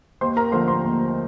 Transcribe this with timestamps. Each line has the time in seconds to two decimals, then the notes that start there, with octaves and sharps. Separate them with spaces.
0.21 D#2 C5 C6
0.36 A#4 A#5
0.52 D3 F3 A3 C5 C6
0.68 C5 C6
0.83 D#2